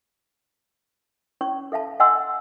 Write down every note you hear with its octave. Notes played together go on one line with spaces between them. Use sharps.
C#4 C#5 C#6
A4 E5 F5 A5 B5
D#5 F#5 G#5 B5 C6 E6